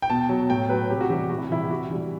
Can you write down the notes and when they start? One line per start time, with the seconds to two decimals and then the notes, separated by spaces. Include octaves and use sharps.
0.02 G5
0.09 B2 A5
0.29 F#3
0.50 A2 G5
0.69 F#3 B4
0.90 C3 G4
1.01 F#4
1.10 E3 G3 G4
1.30 C3 F#4
1.37 E4
1.50 E3 G3 E4
1.64 G4
1.70 C3 F#4
1.90 E3 G3